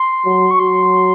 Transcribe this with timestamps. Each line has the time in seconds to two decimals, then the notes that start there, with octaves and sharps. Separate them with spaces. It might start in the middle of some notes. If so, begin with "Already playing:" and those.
Already playing: C6
0.25 F#3
0.51 C#6
0.59 F#3 C6